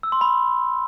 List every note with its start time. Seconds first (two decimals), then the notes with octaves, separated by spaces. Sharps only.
0.03 E6
0.12 C6
0.21 B5